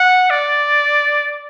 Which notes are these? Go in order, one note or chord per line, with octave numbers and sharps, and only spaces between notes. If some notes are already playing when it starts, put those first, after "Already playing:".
Already playing: F#5
D5